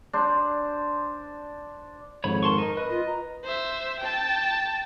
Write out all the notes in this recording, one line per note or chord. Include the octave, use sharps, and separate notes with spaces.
D4 C5
G#1 F2 G#2 C#5 B5
A#4 A5 C6 C#6
D#4 A#4
B4 D#5
F4
A#5
C5 E5
G5 A5